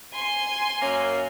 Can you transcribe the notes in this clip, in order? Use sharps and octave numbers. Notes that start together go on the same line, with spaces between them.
G#5 C6
F#2 A#3 C#4